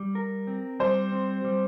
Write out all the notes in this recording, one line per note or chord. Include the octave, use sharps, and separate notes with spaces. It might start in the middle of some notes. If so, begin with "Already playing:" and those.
Already playing: G3
A#4
C4
G3 C5
C4
G3